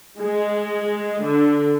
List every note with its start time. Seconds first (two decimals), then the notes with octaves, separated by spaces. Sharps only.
0.20 G#3
1.23 D3